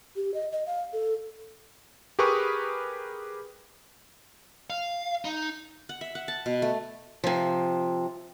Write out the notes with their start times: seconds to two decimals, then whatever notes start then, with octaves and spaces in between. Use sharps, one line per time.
0.16 G4
0.34 D#5
0.52 D#5
0.66 F5
0.93 A4
2.19 G4 G#4 A#4 B4 C#6 D#6
4.70 F5
5.25 D#4
5.89 F#5
6.01 E5
6.15 F#5
6.28 A5
6.46 B2
6.62 A3
7.24 C3 F3